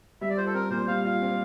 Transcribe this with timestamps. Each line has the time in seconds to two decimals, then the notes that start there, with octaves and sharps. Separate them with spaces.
0.21 G3 E5
0.30 D5
0.37 F4 C5
0.46 A4
0.54 C4 A#4
0.70 A#2 C5
0.88 G3 F5
1.04 F4 F5
1.22 C4